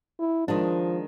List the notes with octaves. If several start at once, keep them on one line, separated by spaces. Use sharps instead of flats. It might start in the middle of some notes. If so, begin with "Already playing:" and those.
E4
D#3 F3 G#3 D4